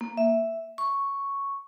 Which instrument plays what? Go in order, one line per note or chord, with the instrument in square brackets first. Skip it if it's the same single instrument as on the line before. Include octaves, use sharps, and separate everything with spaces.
[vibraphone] A#3
E5
C#6